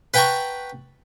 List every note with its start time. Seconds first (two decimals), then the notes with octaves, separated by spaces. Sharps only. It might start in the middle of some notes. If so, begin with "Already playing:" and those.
0.14 B4 F#5 G5 A5 A#5 C#6